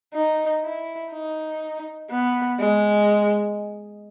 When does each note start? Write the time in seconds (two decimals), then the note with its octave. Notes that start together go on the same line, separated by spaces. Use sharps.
0.14 D#4
0.64 E4
1.12 D#4
2.10 B3
2.59 G#3